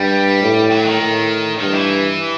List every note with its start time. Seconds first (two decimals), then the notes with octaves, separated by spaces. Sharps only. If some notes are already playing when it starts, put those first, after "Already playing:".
Already playing: G2 G3
0.42 A2
0.71 F#3
0.85 D#3
1.01 A2
1.60 G2 D#3
1.74 E3